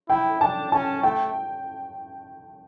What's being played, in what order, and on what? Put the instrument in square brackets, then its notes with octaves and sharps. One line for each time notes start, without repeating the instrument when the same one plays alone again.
[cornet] E4 [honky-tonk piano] G5
[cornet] D4 [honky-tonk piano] A5
[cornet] C#4 [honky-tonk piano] A5
[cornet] A3 [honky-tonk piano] G5